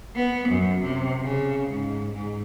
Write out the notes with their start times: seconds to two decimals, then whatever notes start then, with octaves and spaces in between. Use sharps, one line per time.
0.15 B3
0.49 F#2
0.83 C3
1.22 C#3
1.70 G#2
2.12 G#2